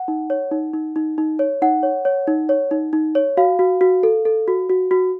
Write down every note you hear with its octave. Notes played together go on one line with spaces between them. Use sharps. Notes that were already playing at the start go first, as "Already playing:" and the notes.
Already playing: F#5
D#4
C#5
D#4
D#4
D#4
D#4
C#5
D#4 F#5
C#5
C#5
D#4
C#5
D#4
D#4
C#5
F#4 F5
F#4
F#4
A4
A4
F#4
F#4
F#4